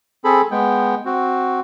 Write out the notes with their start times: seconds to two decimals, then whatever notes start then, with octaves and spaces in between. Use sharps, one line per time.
0.24 C4 G#4 A4 B5
0.51 G#3 B3 G5
1.05 C4 F#4